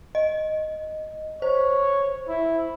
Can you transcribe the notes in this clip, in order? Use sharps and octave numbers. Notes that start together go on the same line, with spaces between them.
D#5
C5 C#5
E4